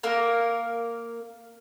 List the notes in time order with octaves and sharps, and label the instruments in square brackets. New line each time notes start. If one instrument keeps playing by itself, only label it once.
[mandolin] A#3 A#4